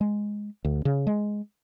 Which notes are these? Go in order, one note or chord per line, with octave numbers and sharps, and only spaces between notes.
G#3
D2
C#3
G#3